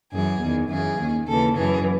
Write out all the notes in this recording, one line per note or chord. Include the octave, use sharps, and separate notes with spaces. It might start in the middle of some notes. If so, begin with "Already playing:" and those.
F#2 E3 G#4
E2 D#3
F#2 C#3 E3 G#4
D#2 D#3
D#2 C#3 E3 A4
F#2 E3 G#4